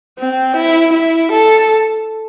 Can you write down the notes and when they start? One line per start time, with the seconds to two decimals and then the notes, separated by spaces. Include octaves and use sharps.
0.19 C4
0.57 E4
0.94 E4
1.33 A4